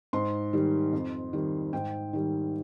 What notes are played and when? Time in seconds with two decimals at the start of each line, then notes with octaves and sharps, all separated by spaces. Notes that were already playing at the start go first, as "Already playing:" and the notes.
0.13 G#2 C6
0.53 D#3 G3
0.93 F2
1.33 D#3 G3
1.73 G#2 G5
2.13 D#3 G3